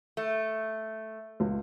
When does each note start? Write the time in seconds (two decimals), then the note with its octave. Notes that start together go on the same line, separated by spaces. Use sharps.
0.17 A3
1.40 C#2